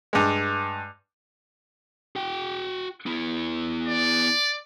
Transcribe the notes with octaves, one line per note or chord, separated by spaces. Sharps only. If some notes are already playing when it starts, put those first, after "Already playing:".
G2 G#3
F#4 G5
B3 E4
D5